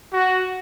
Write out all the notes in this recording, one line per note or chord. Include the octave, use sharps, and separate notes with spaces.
F#4